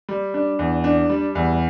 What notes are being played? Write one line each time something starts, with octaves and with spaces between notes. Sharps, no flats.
G3
D4
E2
D4
G3
E2